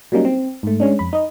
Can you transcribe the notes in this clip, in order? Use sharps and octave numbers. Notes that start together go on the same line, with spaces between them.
F#3 G3 A#3 C#4 D#4
C4
G#2 A3
G#3 C#4 D4
F2 B5
D#4 D#5